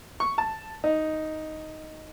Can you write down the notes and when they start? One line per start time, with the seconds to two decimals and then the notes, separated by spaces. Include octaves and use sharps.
0.20 C#6
0.38 A5
0.84 D#4